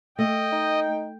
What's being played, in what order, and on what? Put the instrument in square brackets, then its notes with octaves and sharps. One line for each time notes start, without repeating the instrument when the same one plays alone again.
[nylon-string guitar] A3 [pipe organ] D#5 [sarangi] G5
[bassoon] D#4